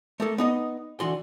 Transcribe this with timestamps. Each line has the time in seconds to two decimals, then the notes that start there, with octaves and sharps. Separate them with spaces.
0.20 A3 A#3 A4
0.38 B3 D#4 D#5
1.00 D3 E3 F#4 C6